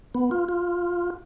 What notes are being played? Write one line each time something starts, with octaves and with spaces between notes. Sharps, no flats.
B3
F4
F4